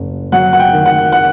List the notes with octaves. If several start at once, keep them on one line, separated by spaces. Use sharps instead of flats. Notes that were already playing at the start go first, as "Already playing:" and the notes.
Already playing: F#1
F#3 F#5
F#5
G5
D#3
F#5
F#5